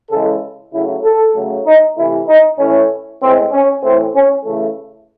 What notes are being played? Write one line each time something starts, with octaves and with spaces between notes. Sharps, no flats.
C#3 E3 G#3 A4
C#3 F#3 A3 E4
A4
C#3 F#3 A3
D#4
C3 E3 A3 E4
D#4
A2 E3 A3 C#4
A2 G#3 C4
C#4
A2 E3 A3 C4
C#4
C#3 E3 A3